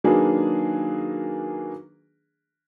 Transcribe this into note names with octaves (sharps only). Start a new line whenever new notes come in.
D#3 F#3 A#3 D4 G#4 B4